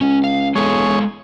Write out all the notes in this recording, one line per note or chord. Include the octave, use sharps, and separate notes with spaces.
C#2 C#4
F5
E1 G#3 G#4 A4 C#5 F5